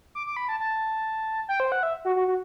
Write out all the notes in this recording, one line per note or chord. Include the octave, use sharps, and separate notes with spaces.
D6
D6
B5
A5
A5
G5
C5
F#5
E5
F#4
F#4
F#4